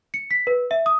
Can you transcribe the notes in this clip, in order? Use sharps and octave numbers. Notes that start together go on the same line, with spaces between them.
C#7
B6
B4
E5
D#6